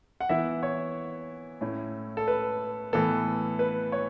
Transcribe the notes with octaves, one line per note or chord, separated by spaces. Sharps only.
F#5
E3 B3 E4 E5
C#5
A2 A3 C#4 E4
A4
B4
A2 E3 B3 A4
B4
C#5